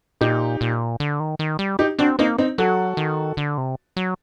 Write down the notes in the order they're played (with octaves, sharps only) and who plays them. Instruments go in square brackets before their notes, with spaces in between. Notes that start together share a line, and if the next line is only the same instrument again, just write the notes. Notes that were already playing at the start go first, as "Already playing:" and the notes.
[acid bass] A#2 [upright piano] D#4 G4
[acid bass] A#2
D3
D#3
D#3
G3
[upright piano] D#4 G4
[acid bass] C4 [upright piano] D4 F#4
[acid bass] A#3 [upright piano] C4 D#4
[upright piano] C4 D#4
[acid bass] F#3 [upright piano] F#4 A4
[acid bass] D#3
D3
C3
F#3